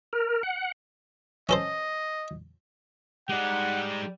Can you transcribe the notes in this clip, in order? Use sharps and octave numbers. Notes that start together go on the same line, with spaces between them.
A#4
F#5
C#4 A4 C5 D#5
G#3 D#4 G4 D5 F#5